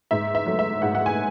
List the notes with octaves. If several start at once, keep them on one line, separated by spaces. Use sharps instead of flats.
G#2 E5
E5
F#3 A3
E5
G#2 F#5
F#5
G#5